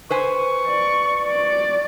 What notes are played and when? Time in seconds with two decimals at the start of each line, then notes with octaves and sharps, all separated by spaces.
0.10 B4 C5 G#5 C#6
0.66 D5
1.24 D5